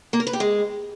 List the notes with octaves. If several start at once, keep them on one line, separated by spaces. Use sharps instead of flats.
A#3
A#4
B4
G4
G#3